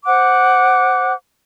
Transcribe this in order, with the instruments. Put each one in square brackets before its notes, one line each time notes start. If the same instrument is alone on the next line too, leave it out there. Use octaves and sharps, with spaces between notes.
[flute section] C5 F#5 D6 F#6